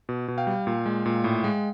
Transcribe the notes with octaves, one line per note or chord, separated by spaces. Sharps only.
B2
B2
F5 G5
G3
A#2
G#3
A#2
A2
G#3